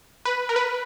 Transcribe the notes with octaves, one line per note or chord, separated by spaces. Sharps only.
B4
A#4
B4